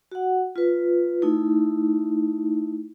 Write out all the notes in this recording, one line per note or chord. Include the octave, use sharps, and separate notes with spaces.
F#4 F#5
F4 B4
A3 D#4 E4